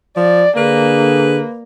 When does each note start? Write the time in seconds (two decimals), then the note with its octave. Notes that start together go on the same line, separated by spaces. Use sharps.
0.17 F3 D5
0.57 D3 A#3 G#4 B4